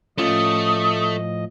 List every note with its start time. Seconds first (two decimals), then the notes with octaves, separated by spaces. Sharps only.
0.18 A2 F3 A3 C#4 F4 D#5 D#6